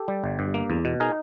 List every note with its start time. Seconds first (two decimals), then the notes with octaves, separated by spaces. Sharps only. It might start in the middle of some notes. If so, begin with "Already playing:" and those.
Already playing: G4 A4
0.08 G3
0.24 G1
0.39 G2
0.54 A#3
0.70 E2
0.85 B2
1.00 D#4 G#4 A#4